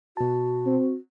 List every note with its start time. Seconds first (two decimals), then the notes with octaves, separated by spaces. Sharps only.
0.17 B2 F#4 A5
0.66 C4